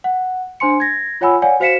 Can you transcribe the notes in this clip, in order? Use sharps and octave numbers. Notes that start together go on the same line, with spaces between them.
F#5
D4 C5 G#5 C6 C#7
G#6 A#6
F4 C#5 F#5 G#5 B5 E6
C#5 D5 F5 F#5 G#5
F#4 C5 F5 B6 C#7 E7